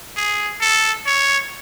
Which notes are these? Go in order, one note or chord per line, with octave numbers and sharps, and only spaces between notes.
G#4
A4
C#5